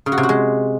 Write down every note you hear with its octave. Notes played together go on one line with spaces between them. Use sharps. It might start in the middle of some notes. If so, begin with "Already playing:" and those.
C#3
F#4
C3
F#4
G#3